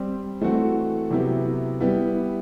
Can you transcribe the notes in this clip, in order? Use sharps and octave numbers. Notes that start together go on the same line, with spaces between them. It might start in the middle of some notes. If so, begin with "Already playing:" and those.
Already playing: G3 C4 G4
E3 A3 C4 F#4
C3 F#3 B3 E4 G4
G3 B3 E4 G4